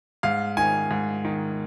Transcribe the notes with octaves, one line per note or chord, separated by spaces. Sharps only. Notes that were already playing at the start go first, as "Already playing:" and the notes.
G#2 F5
D#3 G#5
G#2
D#3